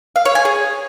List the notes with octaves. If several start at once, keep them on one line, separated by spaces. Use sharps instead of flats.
F5
C#5
G#5
G#4